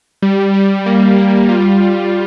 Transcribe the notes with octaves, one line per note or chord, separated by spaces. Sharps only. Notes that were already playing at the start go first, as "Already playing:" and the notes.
G3
G3
A#3
G3
F4
G3